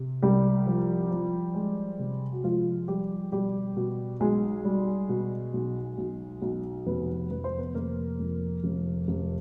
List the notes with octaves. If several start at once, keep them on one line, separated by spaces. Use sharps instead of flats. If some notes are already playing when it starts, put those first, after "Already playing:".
Already playing: C3
C2 G3 G4
F3
F3
G#3
C3
F#4
F3 G#3 F4
F3 G3 G4
B2 G3 G4
B2
B1 G#3 G#4
G3
B2
B1
B1
B1
F1 B3 B4
F1 B4
C5
B3 B4
F1 A#3 A#4
F2
F1
F1